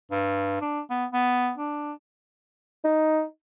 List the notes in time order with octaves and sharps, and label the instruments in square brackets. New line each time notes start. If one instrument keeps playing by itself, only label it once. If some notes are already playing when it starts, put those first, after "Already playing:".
[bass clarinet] G2
D4
B3
B3
D4
[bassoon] D#4